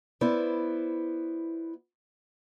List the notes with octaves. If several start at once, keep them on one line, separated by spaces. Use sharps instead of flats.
B3 E4 C5 D5